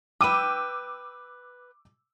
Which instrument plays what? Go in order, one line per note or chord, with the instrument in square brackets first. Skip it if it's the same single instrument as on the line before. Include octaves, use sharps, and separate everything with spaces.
[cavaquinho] B4 G5 [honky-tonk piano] D6 E6 D#7